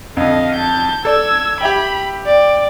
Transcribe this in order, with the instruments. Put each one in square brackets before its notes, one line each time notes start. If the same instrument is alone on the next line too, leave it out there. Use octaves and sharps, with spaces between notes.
[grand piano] F2 D3 [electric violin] D#5 F5
[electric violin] A5 G6
[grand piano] A4 D5 [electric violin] E6 G#6
[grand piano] G4 E5 G5 [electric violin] B5
[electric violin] D5 G5